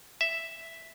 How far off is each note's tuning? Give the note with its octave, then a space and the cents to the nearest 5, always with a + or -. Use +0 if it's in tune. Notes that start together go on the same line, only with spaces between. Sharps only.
E5 +0